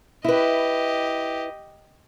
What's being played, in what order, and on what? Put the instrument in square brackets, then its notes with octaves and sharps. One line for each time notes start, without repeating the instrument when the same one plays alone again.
[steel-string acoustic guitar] E4 B4 [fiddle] G4 D#5